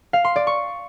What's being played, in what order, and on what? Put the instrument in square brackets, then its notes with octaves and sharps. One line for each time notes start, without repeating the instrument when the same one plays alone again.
[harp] F5
C6
D5
C#6